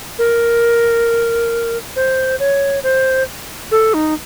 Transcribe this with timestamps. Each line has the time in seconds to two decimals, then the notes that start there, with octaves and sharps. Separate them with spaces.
0.19 A#4
1.96 C5
2.40 C#5
2.83 C5
3.71 A4
3.94 D#4